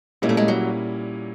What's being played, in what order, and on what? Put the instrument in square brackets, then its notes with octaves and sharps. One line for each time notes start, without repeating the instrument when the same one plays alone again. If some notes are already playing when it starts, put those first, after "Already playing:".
[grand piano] A#2 G3 A#3 C#4 E4 [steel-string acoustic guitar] G#3
[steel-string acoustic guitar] A3
G#3
F#3